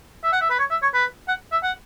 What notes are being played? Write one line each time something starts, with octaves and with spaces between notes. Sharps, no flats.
E5
F#5
E5
B4
C#5
E5
C#5
B4
F#5
E5
F#5